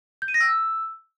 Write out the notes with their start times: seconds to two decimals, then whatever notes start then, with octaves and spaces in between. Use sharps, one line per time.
0.22 G6
0.28 D#7
0.34 A#6
0.41 E6